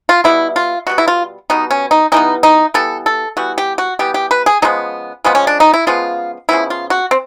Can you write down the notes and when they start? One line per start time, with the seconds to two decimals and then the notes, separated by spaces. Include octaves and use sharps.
0.09 F4
0.24 B2 G3 B3 E4
0.56 F4
0.87 B2 G3 B3 F#4
0.98 E4
1.08 F4
1.50 B2 G3 B3 D#4
1.71 C#4
1.91 D#4
2.12 E3 G3 B3 D#4
2.43 D#4
2.74 E3 G3 B3 A4
3.06 A4
3.37 E3 G3 B3 F#4
3.58 G4
3.78 F#4
3.99 E3 G3 B3 G4
4.14 G4
4.31 B4
4.46 G#4
4.62 C#3 F3 G#3 B3 D#4
5.24 C#3 F3 G#3 B3
5.35 C#4
5.47 D4
5.60 D#4
5.73 E4
5.87 C#3 F3 G#3 B3 F4
6.49 C#3 F3 G#3 B3 E4
6.70 F4
6.90 F#4
7.11 C4